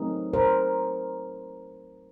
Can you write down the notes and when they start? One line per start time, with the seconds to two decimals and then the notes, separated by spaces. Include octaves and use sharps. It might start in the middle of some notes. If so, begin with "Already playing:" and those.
Already playing: F#3 A3 C4 D#4 G#4 A#4
0.33 A#4 C5